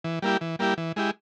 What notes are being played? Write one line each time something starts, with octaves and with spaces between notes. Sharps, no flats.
E3
G3 A#3 E4 G4
E3
G3 A#3 E4 G4
E3
G#3 E4 G4